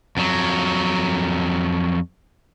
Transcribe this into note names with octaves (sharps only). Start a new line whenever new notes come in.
F2 F#3